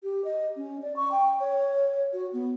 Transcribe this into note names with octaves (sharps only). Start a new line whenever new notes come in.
G4
D#5
C#4
D5
C#6
G5
C#5
F#4
B3